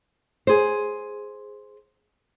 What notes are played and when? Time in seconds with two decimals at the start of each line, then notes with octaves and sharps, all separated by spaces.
0.47 G#4 C5